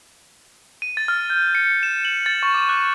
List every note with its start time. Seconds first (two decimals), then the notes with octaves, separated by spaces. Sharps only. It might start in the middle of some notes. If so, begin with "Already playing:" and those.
0.82 D#7
0.97 A6
1.08 F6
1.30 G6
1.55 C#7
1.83 E7
2.05 F#7
2.26 A6
2.43 C#6
2.54 D6
2.69 F#6